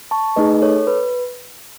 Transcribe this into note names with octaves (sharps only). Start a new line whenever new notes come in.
A5 C#6
A3 D#4 G#4 B4 D#5
A4 C#5
B4